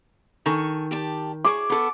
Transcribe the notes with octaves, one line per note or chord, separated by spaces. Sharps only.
D#3 A4 G#5 C#6
G4 D5 A5
E4 G#4 C#6 D6
B3 A4